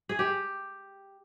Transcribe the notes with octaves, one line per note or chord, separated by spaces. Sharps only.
G#4
G4